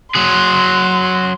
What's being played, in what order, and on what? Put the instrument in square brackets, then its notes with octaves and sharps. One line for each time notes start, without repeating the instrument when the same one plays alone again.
[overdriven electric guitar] F#3 G#4 [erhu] C6